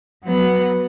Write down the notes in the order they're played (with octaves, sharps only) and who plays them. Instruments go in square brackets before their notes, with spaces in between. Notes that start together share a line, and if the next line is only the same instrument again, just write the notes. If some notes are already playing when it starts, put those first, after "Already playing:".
[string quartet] F#3 B3